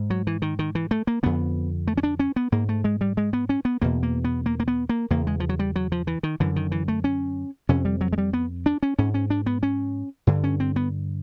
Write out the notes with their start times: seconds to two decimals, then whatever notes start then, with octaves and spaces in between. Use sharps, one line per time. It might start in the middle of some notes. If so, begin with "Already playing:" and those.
Already playing: G#2
0.10 F#3
0.27 E3
0.42 D#3
0.59 D#3
0.75 E3
0.91 A3
1.07 A#3
1.23 F2 D3 B3
1.88 A3
1.98 C#4
2.03 D4
2.20 C#4
2.36 B3
2.52 G#2 A#3
2.69 A3
2.84 G#3
3.01 G3
3.17 G#3
3.33 B3
3.49 C#4
3.65 B3
3.82 E2 B2 A#3
4.03 A#3
4.24 B3
4.46 A#3
4.60 A#3
4.68 B3
4.89 A#3
5.10 E2 C#3 A#3
5.27 G#3
5.40 F3
5.49 F#3
5.59 G3
5.76 F#3
5.92 F3
6.07 E3
6.23 D#3
6.40 F#2 D3 E3
6.56 D#3
6.72 E3
6.88 A3
7.04 C#4
7.69 F2 C3 C#4
7.85 G3
8.01 F#3
8.13 G#3
8.18 G3
8.33 B3
8.66 D4
8.83 C#4
8.98 G#2 C#4
9.14 C#4
9.30 D4
9.46 B3
9.63 C#4
10.27 G2 D3
10.44 C#4
10.60 C4
10.76 B3